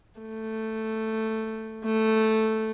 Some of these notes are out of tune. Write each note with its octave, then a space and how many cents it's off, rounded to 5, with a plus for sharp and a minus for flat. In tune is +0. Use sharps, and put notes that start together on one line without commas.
A3 +5
A3 +0